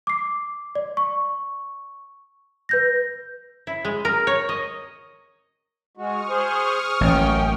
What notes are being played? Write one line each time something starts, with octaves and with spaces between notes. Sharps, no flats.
D6 C7
D5
C#6
B4 G6 A#6
E4
G#3
A#4
C#5
D#5
G#3 F#4 C#6 D#6 F6
G#4 C5
A1 F#2 A#3 C#4 G5